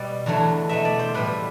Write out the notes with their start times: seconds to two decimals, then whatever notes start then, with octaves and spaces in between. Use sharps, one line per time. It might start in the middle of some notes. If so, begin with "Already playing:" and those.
Already playing: B2 G3 D5
0.26 E2 D3 F#3 A3
0.69 B2 A3 E5
0.85 D5
0.99 C5
1.14 A2 G3 B4